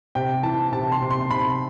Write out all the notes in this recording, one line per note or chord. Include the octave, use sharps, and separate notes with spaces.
C3 G5
E3 A5
C3 A5
C6
C3
C6
C3 B5